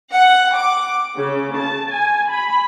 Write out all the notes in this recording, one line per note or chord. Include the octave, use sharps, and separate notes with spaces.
F#5
D6
C#3
A5
G#5
B5